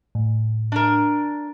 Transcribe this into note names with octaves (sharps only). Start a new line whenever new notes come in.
A2
D4 A#4